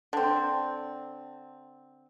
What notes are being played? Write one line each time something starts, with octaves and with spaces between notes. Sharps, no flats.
D3 C4